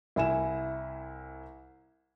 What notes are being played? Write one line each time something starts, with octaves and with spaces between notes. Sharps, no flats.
C2 E4 G#5 E7